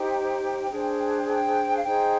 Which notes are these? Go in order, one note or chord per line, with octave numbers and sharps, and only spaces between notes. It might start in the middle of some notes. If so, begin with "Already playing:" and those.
Already playing: D#4 G4 C5 G5
D4 G#4 C5
G5
F5
D#4 G#4 C5 G5